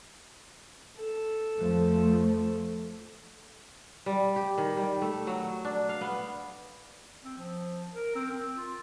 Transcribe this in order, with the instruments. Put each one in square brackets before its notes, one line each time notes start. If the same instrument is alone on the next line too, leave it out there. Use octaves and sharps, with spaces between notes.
[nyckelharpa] A4
[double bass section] F2 F3 A3
[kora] G3
G4
D#3
G3
A3
F#3
D4
F5
B3
[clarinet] C4
F3
A#4
C4
C4
F4